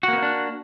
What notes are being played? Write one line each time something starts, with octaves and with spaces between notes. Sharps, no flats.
A#3 B3 D4 D#4 F#4